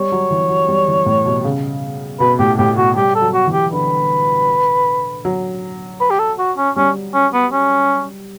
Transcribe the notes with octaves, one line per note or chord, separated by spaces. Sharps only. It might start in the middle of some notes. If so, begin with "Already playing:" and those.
Already playing: G3 C#5
F#3
E3
F#3
G3
E3
A2
B2
C#3
B2 B4
A2 G4
A2 G4
B2 F#4
G3 G4
A4
F#3
F#4
E3
G4
D3 B4
F#3
B4
G4
A4
F#4
C#4
G3 C#4
C#4
B3
C#4